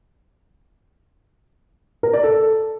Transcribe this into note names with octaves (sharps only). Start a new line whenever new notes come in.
A#4
D5
A4